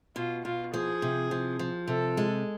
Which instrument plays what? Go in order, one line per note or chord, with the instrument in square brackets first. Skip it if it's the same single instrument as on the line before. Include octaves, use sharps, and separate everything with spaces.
[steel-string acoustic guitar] B2 [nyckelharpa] F4
[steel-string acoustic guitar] B2 [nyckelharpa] F4
[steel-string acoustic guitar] F3 [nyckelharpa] G#4
[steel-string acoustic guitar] C3
F3
F3
[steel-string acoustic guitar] C3 [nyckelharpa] A4
[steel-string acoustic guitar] G#3